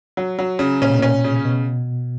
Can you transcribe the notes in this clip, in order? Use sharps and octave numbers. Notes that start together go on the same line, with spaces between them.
F#3
F#3
C#3
A#2 C#4
B2
A#2 C#4
A#2
C#3
B2